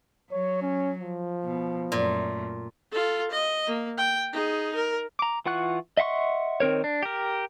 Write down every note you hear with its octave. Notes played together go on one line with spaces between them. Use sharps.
F#3 C#5
C#4
F3
B2
F#2 A#2 A3
F4 A4
D#5
A#3
G5
D#4 G#4
A#4
A#5 D6
E3 F4 F#5 C#6 F#6
D#5 E5 F#5 C6 C#6
D#3 C4 A#4 C#5
D4
G4 A#4